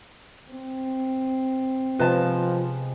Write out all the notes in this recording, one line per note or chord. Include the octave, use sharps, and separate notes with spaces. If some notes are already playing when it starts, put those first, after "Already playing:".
C4
C3 F3 G#3 B3 B4 D#5 A5